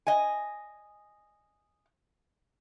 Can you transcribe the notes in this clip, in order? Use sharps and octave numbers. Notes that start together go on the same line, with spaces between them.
D#5 G#5